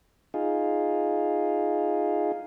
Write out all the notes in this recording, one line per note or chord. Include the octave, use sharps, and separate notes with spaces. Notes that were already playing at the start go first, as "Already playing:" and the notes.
D#4 F4 G#4